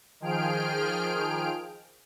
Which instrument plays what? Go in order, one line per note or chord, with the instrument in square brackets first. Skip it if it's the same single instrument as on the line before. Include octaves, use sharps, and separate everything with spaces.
[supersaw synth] D#3 F3 G#4 G5 F6 D7